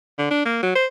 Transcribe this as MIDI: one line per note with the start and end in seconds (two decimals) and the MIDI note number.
0.18 0.29 50
0.31 0.45 62
0.46 0.62 58
0.63 0.72 54
0.76 0.86 72